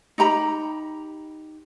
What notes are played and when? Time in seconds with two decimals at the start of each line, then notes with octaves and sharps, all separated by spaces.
0.18 D#4 G4 A#5 B5